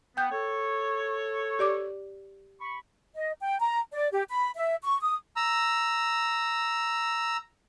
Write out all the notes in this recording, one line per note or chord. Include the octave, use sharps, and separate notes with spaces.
B3 G5 G6
A4 C#5
G4 D5 D6
B5 C#6
D#5
G5
A#5
D5
G4
B5
E5
C#6
D#6
A#5 E6